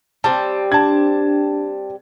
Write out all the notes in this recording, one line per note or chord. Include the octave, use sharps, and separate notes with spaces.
G3 C4 A5
D4 A5 G#6